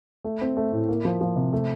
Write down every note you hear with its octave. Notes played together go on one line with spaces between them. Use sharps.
A3
C4
A3
A2
A#3
F3
F3
C3
A3